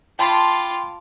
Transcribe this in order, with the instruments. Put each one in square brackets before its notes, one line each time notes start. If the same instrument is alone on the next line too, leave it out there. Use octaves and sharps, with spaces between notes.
[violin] F4 D6 [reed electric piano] G5 B5 C6 [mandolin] A5